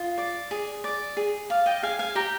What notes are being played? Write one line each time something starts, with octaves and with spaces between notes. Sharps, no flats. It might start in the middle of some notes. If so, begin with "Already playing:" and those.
Already playing: F4 D#5
D5
G#4
D5
G#4
D5 F5
D#5 G5
G#4 F5 G#5
F5 G#5
G4 G5 A#5